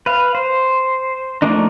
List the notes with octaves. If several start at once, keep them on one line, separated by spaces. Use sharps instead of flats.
B4 F5
C5
F3 A3 A#3 D4 D#4